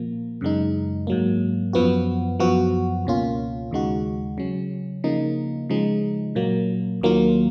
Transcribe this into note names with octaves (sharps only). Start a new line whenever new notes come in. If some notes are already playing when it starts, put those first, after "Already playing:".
Already playing: A#2 F3 A#3
F#2 C#3 G#3 D#4
G#2 F#3 A#3
F#2 F3 B3 F#4
F#2 F3 B3 F#4
C#2 B2 A#3 C#4 F4
D#2 C#3 G#3 D#4 F#4
C#3 F#3 C#4
C#3 F3 A#3 D#4
C#3 F3 G#3 D#4
A#2 F#3 A#3
D#2 D#3 F#3 A#3 F4